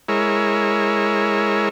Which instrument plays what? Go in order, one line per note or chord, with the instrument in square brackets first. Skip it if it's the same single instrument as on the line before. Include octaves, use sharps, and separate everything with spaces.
[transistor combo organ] G#3 E4 A#4 C#5